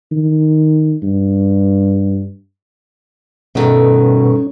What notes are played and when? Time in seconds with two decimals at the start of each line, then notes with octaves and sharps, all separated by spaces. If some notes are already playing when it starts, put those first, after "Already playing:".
0.12 D#3
1.03 G2
3.55 G2 B2 D#3 A3 C#4